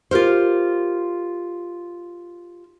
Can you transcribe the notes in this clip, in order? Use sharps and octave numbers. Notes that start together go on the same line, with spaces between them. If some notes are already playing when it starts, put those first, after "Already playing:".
F4 G4 A#4 C5